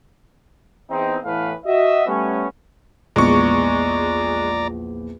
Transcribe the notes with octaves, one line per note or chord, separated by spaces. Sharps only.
E2 C4 D#4
A2 E3 A3 B3 B4 F5
F#4 D#5 E5
G3 A3 B3 C#4
A#1 E2 G#3 D5 A#5 C#6